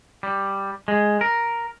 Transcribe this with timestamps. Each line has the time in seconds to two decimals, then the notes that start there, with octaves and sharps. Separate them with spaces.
0.23 G3
0.88 G#3
1.21 A#4